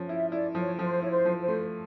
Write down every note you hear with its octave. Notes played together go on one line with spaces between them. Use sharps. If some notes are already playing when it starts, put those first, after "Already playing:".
Already playing: F3 C#4
E4 E5
E4 D5
F3 C#5
F3 C5
E4 C#5
C5
F3
C5
A3